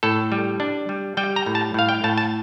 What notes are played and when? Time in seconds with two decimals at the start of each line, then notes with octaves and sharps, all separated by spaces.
0.03 A2 A4
0.32 G3
0.60 D4
0.89 G3
1.17 G3 G5
1.36 A#5
1.46 A2
1.55 A5
1.74 A2 F5
1.89 G5
2.04 A2 A5
2.18 A5